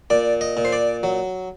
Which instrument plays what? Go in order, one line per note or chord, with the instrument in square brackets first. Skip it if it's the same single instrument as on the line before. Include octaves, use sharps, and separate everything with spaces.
[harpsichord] A#2 D5
D#5
A#2
C5
D5
F#3